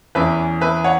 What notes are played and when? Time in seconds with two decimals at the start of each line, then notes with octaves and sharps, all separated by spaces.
0.15 E2 E3 C#4 B4 E5
0.61 B4 E5
0.84 C#5 F#5